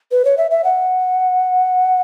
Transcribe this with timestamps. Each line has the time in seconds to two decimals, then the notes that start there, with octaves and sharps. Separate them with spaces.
0.11 B4
0.25 C#5
0.37 E5
0.51 E5
0.64 F#5